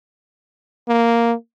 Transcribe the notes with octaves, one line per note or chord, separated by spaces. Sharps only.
A#3